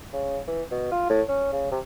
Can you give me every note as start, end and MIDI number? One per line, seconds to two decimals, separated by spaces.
0.13 0.39 49
0.48 0.62 52
0.71 0.91 47
0.92 1.06 65
1.09 1.22 45
1.29 1.48 61
1.52 1.68 49
1.72 1.79 48